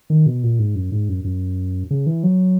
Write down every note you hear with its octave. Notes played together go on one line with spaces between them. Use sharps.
D#3
B2
A#2
G#2
F#2
G#2
F#2
F#2
C#3
E3
F#3